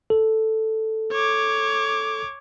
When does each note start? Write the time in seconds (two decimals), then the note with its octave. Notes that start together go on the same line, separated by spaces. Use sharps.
0.10 A4
1.12 C#5 D6